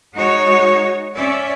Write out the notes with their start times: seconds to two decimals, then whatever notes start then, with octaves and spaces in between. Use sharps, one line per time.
0.15 G#3 D#4 F#4 C#5
1.15 C#4 D5 E5